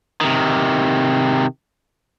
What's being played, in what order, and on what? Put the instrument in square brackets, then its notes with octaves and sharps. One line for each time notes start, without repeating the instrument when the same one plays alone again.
[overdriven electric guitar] C3 D#3